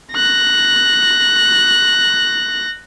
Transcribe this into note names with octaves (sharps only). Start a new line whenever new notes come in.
F#6 A#6